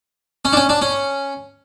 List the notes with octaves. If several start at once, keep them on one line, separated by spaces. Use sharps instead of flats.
C#4
D4
C#4
D4
C#4